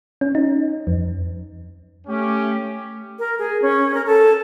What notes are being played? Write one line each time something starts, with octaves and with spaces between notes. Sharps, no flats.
C#4
D#4
F2
A3 C#4 G4
A#4
G#4
C#4
A#4
A4